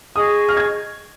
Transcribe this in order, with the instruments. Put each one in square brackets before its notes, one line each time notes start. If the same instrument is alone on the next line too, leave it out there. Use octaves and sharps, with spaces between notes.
[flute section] G#4 D#5 C#6 [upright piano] D#6
[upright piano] F6
G#6